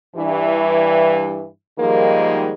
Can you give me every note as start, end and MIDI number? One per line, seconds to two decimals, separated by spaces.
0.15 1.48 43
0.15 1.48 52
1.79 2.53 44
1.79 2.53 51
1.79 2.53 53
1.79 2.53 55
1.79 2.53 56
1.79 2.53 58